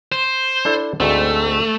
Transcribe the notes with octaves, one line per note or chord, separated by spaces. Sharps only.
C5
D4 E4 A4
D2 G#2 A3 C4